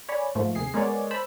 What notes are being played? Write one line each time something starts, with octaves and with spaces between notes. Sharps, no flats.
C#5 D5 G#5 B5
G#2 F3 A3 A#3
D#2 C3 G#4 C7
G#3 B3 G#4 A#4 C#5 D5
C5 A5 B5 E6